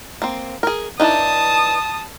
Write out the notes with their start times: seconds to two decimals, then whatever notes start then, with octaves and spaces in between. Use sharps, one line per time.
0.22 A#3 C4
0.63 G#4 A#4
1.00 E3 D4 D#4 A5 D#6